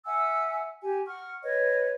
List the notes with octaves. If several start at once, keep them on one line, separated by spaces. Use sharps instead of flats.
E5 F#5 G#5 E6
G4 G#5
F#5 C#6 F6
B4 C#5 D#5